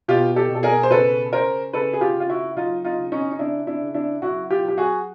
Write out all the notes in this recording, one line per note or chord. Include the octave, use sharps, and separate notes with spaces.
B2 F4 G4
G4 A4
B2
A4
G#4 A#4
C5
C#3 A4 B4
C#3 A#4 C5
C#3 A4 B4
G#4
F4 G4
C#3 F4
E4 F#4
F#3 D#4 F4
D#4 F4
C#3
C#4 D#4
D#4
C#3 D4 E4
D4 E4
C#3
D4 E4
F#3 E4 F#4
F4 G4
F#3 G4
F#4 G#4